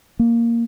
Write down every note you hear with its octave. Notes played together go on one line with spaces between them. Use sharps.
A#3